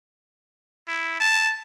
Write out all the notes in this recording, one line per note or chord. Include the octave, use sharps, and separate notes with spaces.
E4
A5